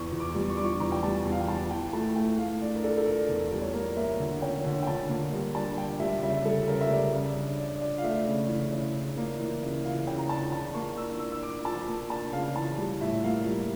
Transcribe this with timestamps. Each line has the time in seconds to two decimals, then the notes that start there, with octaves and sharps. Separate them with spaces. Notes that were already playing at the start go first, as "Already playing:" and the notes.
Already playing: E2 C#6
0.12 E2
0.20 D6
0.35 G3
0.50 C#6
0.57 D4 D6
0.65 C#6
0.80 E2 A#5
0.92 G5
1.03 G3 A5
1.25 E2
1.32 F5
1.40 G5
1.48 E3 A5
1.71 E3 G5
1.93 A3 A5
2.16 A3 G5
2.38 A3 F5
2.61 D4 D5
2.76 A#4
2.84 D4 A4
2.97 A4
3.06 D4 A#4
3.29 E2
3.48 G3 D5
3.61 C#5
3.74 A#3 A#4
3.97 A#3 E5
4.19 D3
4.42 C#4 G5
4.65 D3
4.82 G5
4.87 D3 A5
5.09 A#3
5.33 G3
5.55 D4 A5
5.78 D4 G5
6.00 G3 E5
6.23 C#3 E5
6.45 G3 A4
6.68 C#3 A#4
6.81 E5
6.91 G3 D5
7.14 C#3
7.36 D4
7.58 D4
7.81 D4
7.98 F5
8.03 A3 E5
8.26 C#3
8.49 E3
8.72 C#3
8.94 D4
9.17 A#3
9.39 E3
9.62 C#3
9.85 E3 F5
10.07 C#3 G5
10.18 A#5
10.29 D4 A5
10.52 E3 A5
10.74 A#3 C#6
10.97 D4 E6
11.20 D4 E6
11.32 E6
11.43 D4 D6
11.65 F3 A5
11.88 A#3
12.10 D4 A5
12.33 C#3 F5
12.56 E3 A5
12.78 G3
13.01 A2 E5
13.24 A#3 F5
13.46 G3